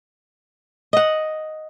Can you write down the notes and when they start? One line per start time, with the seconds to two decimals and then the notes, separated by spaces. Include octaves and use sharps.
0.93 D#5 F#5